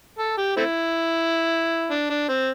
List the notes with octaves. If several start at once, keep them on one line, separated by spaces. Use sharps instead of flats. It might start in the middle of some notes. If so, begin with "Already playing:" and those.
A4
G4
A3 C4 E4
D4
D4
C4